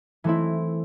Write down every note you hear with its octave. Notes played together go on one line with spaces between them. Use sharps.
E3 A3 C4 E4